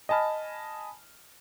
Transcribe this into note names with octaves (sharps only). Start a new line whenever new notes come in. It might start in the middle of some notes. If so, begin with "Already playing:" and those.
D#5 G#5 A5 B5 F6